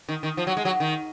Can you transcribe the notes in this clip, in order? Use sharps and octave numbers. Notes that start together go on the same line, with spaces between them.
D#3
D#3
F3
F#3
G#3
F#3
D#3